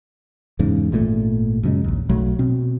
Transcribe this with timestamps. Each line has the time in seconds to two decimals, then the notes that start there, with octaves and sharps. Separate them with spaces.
0.59 E2 G#2 C#3
0.92 G#1 A#2 D#3 A3
1.63 F#2 C#3 G#3
1.84 A#1 D#2
2.09 B1 F#3 A3
2.39 B2 C4